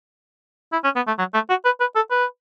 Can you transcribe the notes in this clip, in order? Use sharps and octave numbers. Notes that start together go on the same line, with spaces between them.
E4
C#4
B3
A3
F#3
A3
F#4
B4
B4
A4
B4